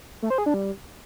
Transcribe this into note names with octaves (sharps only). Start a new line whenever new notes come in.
A3
C5
G#4
D4
G3